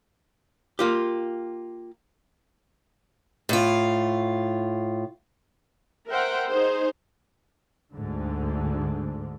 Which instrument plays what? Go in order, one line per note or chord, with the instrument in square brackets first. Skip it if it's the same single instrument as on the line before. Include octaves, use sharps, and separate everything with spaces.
[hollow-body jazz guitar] A#3 F4 G4
[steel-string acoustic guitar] A2 F4
[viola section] A#4 C5 E5 F#5 G5
D#4 G#4 C5
[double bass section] D2 G#2 D3